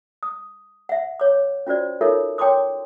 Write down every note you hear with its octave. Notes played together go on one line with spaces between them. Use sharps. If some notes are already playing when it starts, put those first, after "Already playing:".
D#6
E5 F#5
C#5 D6
C#4 F4 F#4 C5 D5
D#4 F4 A4 A#4 C#5 E5
C#5 G5 A5 C6 D6 D#6